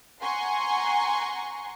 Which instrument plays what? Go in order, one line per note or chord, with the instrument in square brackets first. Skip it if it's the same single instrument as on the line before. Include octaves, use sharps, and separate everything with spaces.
[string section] F#5 G#5 A#5 C6 C#6